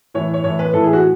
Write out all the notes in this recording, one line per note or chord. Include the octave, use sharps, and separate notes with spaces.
A2 E3 C#5
C#5
A2 E3 C#5
B4
A2 E3 A4
G#4
F#4